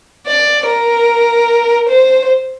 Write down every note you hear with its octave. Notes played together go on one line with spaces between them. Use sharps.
D5
A#4
C5